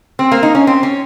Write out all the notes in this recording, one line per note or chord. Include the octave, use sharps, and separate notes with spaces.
C4
A#3
D#4
C#4
C4
C#4